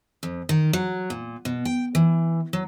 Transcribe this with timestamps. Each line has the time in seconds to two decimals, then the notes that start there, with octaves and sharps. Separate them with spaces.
0.23 F2
0.49 D#3
0.73 F#3
1.10 A#2
1.45 B2
1.65 G5
1.95 E3
2.53 F#3